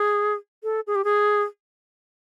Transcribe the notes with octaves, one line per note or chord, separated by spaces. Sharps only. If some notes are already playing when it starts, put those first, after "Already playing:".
Already playing: G#4
A4
G#4
G4
G#4